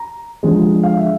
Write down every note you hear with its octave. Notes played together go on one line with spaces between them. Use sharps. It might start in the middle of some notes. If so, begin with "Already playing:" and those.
Already playing: A#5
D3 F3 G#3
F5
E5